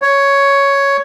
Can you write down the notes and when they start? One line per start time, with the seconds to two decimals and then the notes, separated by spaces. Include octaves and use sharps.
0.02 C#5